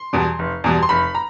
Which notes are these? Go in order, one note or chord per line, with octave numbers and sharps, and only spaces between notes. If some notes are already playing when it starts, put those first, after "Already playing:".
Already playing: C6
E2 B2 G3
F1
E2 B2 G3
C6
F1 B5
A#5